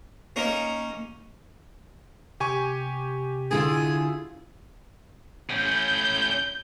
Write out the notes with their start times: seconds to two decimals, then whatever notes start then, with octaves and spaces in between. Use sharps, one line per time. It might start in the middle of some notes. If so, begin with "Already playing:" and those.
0.36 A#3 C#4 D#4 A#4
2.40 C3 G4 G#5 C#6
3.51 D3 E4 F4 G#4
5.50 A2 C#4 G6